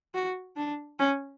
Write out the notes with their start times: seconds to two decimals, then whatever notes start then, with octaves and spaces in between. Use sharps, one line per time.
0.14 F#4
0.56 D4
0.99 C#4